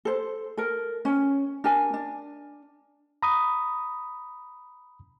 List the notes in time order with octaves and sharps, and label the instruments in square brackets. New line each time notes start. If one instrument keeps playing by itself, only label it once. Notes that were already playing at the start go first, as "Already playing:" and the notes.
[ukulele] A4 C5
A4 A#4
C#4
D4 A#4 G#5
D4
[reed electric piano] A#5 B5 D#6